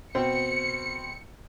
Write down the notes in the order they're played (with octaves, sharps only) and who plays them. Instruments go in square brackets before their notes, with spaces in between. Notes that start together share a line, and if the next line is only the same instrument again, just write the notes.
[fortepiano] B2 C4 G5 [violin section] C#7